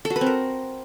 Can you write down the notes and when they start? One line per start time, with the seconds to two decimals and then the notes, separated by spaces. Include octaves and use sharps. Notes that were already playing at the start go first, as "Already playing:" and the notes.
0.05 A4
0.10 F#4
0.16 B4
0.21 C4
0.26 A#4